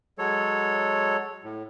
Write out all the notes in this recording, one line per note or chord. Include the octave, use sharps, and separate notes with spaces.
F#3 G#3 A4 C#5
A2